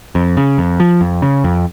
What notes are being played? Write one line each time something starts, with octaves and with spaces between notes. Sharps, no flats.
F2
C#3
F2
F3
F2
C#3
F2